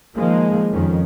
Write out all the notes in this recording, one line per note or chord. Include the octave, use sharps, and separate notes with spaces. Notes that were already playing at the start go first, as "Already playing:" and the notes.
D#3 F3 G#3 A#3
F2 D#3 C#4